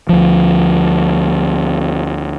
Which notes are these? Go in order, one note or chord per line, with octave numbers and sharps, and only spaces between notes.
D2 F3